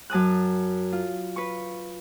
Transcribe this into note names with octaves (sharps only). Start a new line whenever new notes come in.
F#2 A5 D#6 F#6
F4
B4 C#6